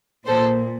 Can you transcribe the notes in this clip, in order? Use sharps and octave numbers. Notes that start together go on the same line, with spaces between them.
A#2 A4 C5